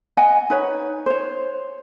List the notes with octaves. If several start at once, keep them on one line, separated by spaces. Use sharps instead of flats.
D#5 F#5 G#5
D#4 B4 C#5
C5 C#5